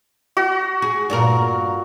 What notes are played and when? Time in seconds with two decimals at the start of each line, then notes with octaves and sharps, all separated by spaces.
0.37 F#4
0.82 G#4
1.10 G2 A#2 A#4